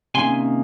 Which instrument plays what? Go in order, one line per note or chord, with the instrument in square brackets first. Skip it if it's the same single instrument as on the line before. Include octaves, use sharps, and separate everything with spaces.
[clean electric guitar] C3 D#3 A#3 C#4 G#5 C6